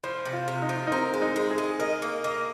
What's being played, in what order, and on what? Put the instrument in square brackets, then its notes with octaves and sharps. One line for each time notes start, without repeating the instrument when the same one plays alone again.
[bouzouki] F3 [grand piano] C5
[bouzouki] C3
[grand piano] F4
[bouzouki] C3
[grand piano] D#4
[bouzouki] F3
[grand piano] D#4
[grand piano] C4 [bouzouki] A#4
[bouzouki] G#3
[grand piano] D#4
[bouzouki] G#3
[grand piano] G#4
[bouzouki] G#3
[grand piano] A#4 [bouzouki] D#5
[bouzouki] A#3
[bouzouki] A#3 [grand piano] D#5